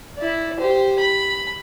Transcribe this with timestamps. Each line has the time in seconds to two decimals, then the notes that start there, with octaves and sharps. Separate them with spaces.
0.18 E4 D5
0.59 G4 C5
0.99 B5